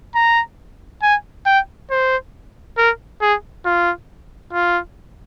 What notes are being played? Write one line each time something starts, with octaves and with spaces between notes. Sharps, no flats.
A#5
G#5
G5
C5
A#4
G#4
F4
F4